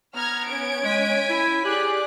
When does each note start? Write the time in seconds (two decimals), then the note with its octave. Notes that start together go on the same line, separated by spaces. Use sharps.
0.14 B3 A#5 F6 G#6
0.48 C#4 G#6 D7
0.85 G#3 G#5 B6
1.30 E4
1.64 G4 G#4 D5 F#6